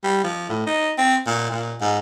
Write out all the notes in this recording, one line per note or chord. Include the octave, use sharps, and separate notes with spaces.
G3
F3
A2
D#4
C4
A#2
A#2
G#2